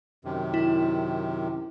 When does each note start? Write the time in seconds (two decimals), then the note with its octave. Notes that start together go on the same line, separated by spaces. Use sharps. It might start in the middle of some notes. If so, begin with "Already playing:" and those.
0.25 F#2 C3 D#3
0.54 E4